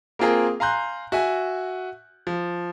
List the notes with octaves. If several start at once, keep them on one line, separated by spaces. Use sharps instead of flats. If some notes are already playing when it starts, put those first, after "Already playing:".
A#3 C4 F4 G#4 A#4
F5 G#5 A#5 C6 F#6 G6
F#4 E5 G#5
F3